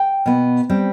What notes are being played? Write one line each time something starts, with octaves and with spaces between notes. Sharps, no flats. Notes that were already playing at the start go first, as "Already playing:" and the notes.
Already playing: G5
B2 B3
G3 C4